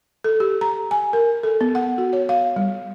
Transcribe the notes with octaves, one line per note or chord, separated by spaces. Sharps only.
A4
G4
A#5
G#5
A#4
A4
B3
F#5
F#4
C#5
F5
G3